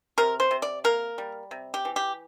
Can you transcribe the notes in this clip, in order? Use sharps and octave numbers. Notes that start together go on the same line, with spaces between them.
C3 A#4
C5
C3
D5
A#3 A#4
G3
C3
G4
E3
G4